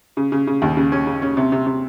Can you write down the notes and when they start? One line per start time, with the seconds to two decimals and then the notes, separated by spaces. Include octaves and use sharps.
0.17 C#3
0.32 C#3
0.47 C#3
0.62 D#2
0.77 C#3
0.92 C#4
1.07 C#3
1.22 C#4
1.37 C3
1.52 C3
1.66 C3